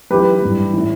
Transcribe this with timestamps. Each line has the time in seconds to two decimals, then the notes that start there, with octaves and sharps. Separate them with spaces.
0.11 F#2 E3 G4 B4
0.42 G2 E3
0.74 A2 E3